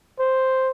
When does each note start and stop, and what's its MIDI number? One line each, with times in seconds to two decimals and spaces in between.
0.20 0.71 72